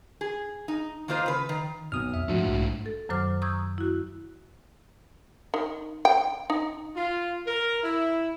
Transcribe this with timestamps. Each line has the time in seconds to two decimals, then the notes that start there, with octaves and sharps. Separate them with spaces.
0.21 G#4
0.68 D#4
1.08 D#3 A#3 F4 C5 D#5
1.26 C#3 B4
1.49 D#3
1.92 B1 B3 D#6 F6
2.14 F2 E5
2.28 G#2 F3 A3 D4 F4 F#4
2.48 B1
2.86 A4
3.09 F#2 D#3 F#3 C5 D6 F6
3.42 A#5 C#6 D#6 E6 G6 G#6
3.78 E4 F#4
5.54 D#3
6.05 G5
6.50 D#4
6.96 F4
7.46 A#4
7.83 E4